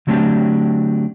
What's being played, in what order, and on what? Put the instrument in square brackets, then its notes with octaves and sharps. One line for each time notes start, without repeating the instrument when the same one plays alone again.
[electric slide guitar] D3 F#3 A3 C4 D4 G4